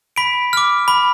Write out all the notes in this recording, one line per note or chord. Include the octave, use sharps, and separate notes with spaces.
B5 B6 D7
D6 F6
B5